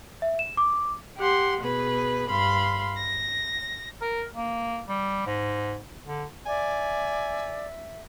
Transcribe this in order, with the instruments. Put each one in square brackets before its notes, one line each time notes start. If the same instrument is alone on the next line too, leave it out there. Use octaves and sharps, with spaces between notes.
[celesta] E5
E7
D6
[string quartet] G4 F#5 C6
B2 G#4 B4
G2 F5 B5 C6
A#6
[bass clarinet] A#4
A#3
G3
G#2
D3
[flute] D5 [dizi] E5 [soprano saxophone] G#5